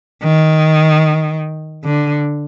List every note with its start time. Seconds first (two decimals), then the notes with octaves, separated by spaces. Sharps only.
0.23 D#3
1.84 D3